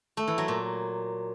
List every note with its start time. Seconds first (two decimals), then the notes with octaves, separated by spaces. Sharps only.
0.17 A3
0.28 E3
0.38 F#3
0.48 A#2